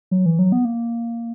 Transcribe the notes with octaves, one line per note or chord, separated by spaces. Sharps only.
F#3
E3
F#3
B3
A#3